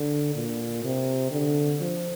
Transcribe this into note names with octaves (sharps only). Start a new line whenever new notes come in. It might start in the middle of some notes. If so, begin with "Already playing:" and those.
Already playing: D3
A#2
C3
D3
F3